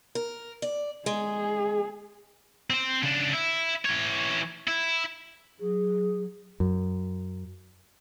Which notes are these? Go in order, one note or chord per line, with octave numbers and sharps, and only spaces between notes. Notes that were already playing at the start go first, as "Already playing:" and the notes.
A#4
D5
G#3 G#4
C4 C5
C#3 D4
E4
E3 C#5
E4
F#3 G#4
F#2